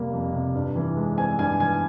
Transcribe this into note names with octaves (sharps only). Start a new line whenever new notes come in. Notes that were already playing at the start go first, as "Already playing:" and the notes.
Already playing: F2 C3 G3 A#3
F2
C3
G2
E3
G#3
C4 G#5
G2 G#5
E3 G#5